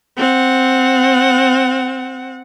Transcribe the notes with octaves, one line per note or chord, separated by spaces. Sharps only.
C4 F#5